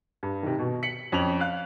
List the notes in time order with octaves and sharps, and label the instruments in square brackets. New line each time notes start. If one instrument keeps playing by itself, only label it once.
[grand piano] G2
C3 D#3
B2
B6 C#7 F#7
F2 C#4 G5 F7 F#7
F5 F#6